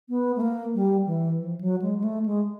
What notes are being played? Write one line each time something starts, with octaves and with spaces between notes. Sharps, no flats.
B3
A3
A#3
G3
E3
F3
F#3
G#3
G#3
A3
G#3